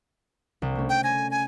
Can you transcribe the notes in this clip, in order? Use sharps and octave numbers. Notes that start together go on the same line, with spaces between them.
C2 D6
A3 C#4
G5
G#5 A#6
G#5